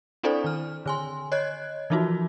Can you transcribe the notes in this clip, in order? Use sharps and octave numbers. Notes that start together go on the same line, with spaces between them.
C4 D4 E4 A4 C5 D5
D#3 F6
D3 G#5 C6
C#5 D#5 F#6 G#6
E3 F3 D#4 F4 F#4